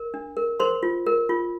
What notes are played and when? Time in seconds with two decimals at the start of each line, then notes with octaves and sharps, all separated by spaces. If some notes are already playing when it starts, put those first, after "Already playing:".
Already playing: A#4
0.14 D4
0.37 A#4
0.60 A#4 C5 C6
0.83 F4
1.06 A#4
1.29 F4